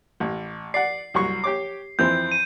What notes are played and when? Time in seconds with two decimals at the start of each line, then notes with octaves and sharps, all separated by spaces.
0.20 A1
0.74 D5 F#5 C7
1.14 C2 F#3 C#6
1.44 G4 C#5 D6
1.99 F2 E3 C4 G6
2.32 D#7